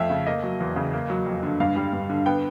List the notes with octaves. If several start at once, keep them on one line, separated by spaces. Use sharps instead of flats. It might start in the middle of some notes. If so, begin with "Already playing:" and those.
Already playing: F2 F3 A3 E5 F5
C#3
A#3 D#5
F#3
E2
C#3
A#3
F#3
F2
D3
G2 F5
G3
G2
D3
B3 G5